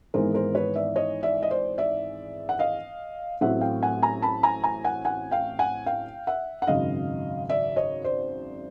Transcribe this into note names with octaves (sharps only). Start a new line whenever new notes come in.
G#1 G#2 E3 G#3 B3 A#4 C5
A#4 C5
B4 C#5
D5 E5
C#5 D#5
D5 E5
D#5
C5 D5
D5 E5
F#5
D#5 F5
A1 A2 F#3 A3 C4 E5 F#5
F5 G5
F#5 G#5
G#5 A#5
A5 B5
G#5 A#5
G#5 A#5
F#5 G#5
F#5 G#5
F5 G5
F#5 G#5
F5 G5
E5 F#5
F#5
G#1 F#2 C#3 D#5 F5
D5 E5
C#5 D#5
C5 D5